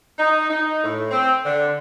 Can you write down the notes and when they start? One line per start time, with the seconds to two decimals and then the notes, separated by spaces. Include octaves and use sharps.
0.18 D#4
0.49 D#4
0.84 A2
1.11 C4
1.45 D3